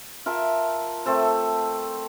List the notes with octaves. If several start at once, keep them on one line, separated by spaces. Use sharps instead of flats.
F4 A#4 E5 A5
A3 C4 A4 C5